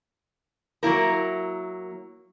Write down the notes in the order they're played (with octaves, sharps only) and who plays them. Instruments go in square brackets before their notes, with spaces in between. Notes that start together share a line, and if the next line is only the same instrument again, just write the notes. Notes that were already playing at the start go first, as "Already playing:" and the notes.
[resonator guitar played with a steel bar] F#3 A#3 E4 A#4